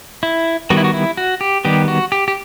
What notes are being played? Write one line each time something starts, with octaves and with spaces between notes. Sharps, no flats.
E4
D#3 G3 B3 F#4
E4
F#4
E4
F#4
G4
D#3 G3 B3 G4
F#4
G4
G4